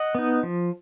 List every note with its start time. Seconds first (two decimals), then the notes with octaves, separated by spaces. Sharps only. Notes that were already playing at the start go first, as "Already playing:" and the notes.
Already playing: D#5 F#5
0.15 B3 D#4
0.43 F3